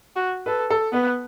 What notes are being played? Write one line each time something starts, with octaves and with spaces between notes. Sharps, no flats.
F#4
A4 B4
A4
B3 B4